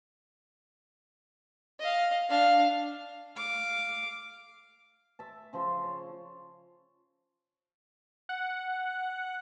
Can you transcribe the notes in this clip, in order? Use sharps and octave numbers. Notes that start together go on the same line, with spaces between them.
D#5 F5
D4 F5
F5 D6
E5 A5
C#3 F3 C5 C6
C#5
F#5